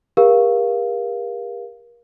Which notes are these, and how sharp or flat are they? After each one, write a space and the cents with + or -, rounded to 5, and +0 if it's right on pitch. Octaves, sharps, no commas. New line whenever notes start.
G4 +45 A#4 +35 F5 +0